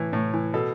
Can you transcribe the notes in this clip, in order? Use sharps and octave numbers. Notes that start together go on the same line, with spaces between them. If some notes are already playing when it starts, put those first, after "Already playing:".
Already playing: A2 E3
A2
E3
B2 A4